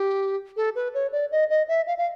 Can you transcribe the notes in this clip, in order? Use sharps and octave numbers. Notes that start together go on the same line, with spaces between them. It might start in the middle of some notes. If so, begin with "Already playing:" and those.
Already playing: G4
A4
B4
C#5
D5
D#5
D#5
E5
F5
F5